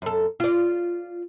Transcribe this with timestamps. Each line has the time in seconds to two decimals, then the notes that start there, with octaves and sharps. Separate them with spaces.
0.02 F#2 A4
0.40 F4 D5